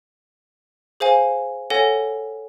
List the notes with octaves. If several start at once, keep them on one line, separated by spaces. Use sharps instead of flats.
G#4 C5 F5 G#5
A4 C#5 F#5 G#5 A#6